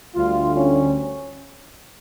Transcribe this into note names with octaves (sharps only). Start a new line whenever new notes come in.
D2 D3 G3 F4
C#4